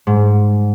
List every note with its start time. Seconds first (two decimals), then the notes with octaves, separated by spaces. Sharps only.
0.07 G#2